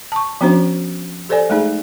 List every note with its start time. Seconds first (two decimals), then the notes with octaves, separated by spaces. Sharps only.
0.12 A5 C#6
0.41 F3 B3 C#4 D4 F#4 C5
1.29 G4 A4 C5 D5 G#5
1.50 G#3 A3 D#4 G#4